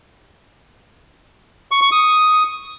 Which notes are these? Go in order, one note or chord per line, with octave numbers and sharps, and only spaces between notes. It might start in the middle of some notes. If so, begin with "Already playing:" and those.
C#6
C#6
D#6